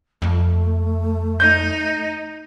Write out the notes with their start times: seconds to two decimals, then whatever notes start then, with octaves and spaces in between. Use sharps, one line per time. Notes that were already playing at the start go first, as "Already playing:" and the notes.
0.22 F2 A3
1.40 D#4 G6